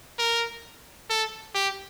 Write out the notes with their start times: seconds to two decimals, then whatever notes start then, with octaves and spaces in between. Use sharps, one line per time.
0.19 A#4
1.10 A4
1.55 G4